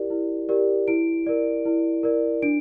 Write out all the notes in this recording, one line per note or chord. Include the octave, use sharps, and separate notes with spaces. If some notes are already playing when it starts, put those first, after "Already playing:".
Already playing: E4 G4 A#4 D5
E4
G4 A#4 D5
E4 D7
A#4 D5
E4
A#4 D5
D4 D7